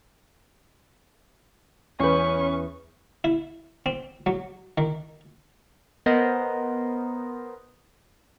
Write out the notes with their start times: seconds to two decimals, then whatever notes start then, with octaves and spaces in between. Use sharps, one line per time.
2.00 E2 C#4 B4 C#5 C#6 G6
3.24 E4
3.86 C4
4.26 F#3
4.78 D#3
6.06 B3 A#4 C5 D#5